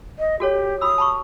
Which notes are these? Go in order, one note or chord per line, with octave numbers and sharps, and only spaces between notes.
D#5
F#4 G4 A4 C#5
F#4 B5 D#6 E6
A5 B5 C#6